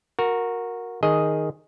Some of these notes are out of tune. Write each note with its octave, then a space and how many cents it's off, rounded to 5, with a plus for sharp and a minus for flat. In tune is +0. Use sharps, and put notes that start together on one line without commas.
F#4 -15 A#4 +0
D#3 +0 G#4 +0 D#5 +0